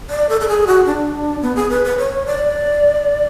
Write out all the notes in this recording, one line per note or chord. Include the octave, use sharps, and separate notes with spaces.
D5
A4
A4
G#4
F#4
D4
B3
G#4
B4
B4
C#5
D5